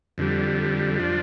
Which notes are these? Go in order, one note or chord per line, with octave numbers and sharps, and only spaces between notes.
F2 D3 G3
F3 D4